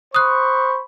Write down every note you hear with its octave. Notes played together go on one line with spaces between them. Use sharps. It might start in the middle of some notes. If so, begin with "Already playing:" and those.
C5 B5 C#6 D#6 F#6